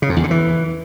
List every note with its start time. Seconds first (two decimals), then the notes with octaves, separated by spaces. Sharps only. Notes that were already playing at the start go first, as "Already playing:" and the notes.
0.02 C#3
0.09 F2
0.16 E2
0.24 D3
0.31 E3